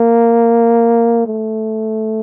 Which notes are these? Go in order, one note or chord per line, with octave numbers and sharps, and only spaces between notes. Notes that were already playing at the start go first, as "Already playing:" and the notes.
Already playing: A#3
A3